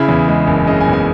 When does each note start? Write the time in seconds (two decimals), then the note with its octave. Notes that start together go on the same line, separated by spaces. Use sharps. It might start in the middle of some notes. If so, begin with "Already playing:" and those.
Already playing: C#3 E4
0.09 E2
0.28 G#3
0.47 F#1
0.67 C#3 D#5
0.80 G#5
0.87 E2
0.93 G#5